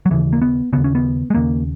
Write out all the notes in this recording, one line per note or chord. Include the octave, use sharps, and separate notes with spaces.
F#3
D#2 C#3 E3
A#3
B3
D#2 C#3 B3
C#4
B3
G#3
D#2 C#3 A#3